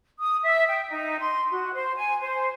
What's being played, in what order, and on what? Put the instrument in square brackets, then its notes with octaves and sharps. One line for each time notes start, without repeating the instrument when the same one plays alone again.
[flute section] D#6
E5
G5
D#4
C6
F#4
C5
G#5
C5